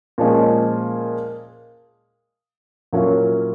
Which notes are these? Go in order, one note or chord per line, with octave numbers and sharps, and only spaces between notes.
A#2 F3 G#3 C#4
A#2 F#3 A#3 C#4 E4